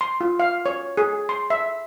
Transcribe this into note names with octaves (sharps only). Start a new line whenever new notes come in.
C6
F4
F5
C#5
G#4
C6
E5